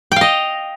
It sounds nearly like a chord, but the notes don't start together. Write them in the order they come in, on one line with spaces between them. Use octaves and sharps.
G5 F5 D#5